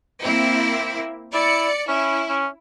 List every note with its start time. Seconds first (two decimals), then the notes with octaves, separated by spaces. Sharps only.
0.23 A#3 C4 E4
1.34 E4 D5 C#7
1.88 C#4 E4
2.29 C#4